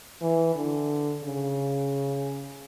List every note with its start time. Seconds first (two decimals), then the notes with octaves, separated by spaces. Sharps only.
0.21 E3
0.55 D3
1.24 C#3